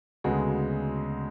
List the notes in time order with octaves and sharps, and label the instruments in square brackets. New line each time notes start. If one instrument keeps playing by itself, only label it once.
[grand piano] D2 C#3 G#3 B3 F#4